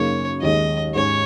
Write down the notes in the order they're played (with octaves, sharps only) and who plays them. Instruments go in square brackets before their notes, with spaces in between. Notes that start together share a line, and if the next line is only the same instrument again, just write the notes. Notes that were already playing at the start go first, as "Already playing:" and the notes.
Already playing: [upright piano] F#2 C#3 A#3 D#4 G#4 [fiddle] C#5
[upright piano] D#2 D#3 G#3 [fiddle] D#5
[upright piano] G#2 G#3 C#4 [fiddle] C#5